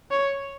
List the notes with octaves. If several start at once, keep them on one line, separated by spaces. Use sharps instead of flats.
C#5